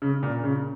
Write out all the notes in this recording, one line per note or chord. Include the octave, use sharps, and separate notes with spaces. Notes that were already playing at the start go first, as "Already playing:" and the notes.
C#3
A#2
C#3